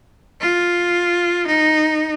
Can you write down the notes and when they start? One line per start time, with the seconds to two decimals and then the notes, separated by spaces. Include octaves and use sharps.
0.41 F4
1.46 D#4